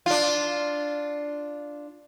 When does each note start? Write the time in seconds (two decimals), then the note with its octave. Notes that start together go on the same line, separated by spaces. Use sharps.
0.06 D4 F4